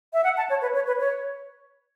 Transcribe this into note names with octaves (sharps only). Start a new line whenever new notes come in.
E5
F#5
A5
C#5
B4
C#5
B4
C#5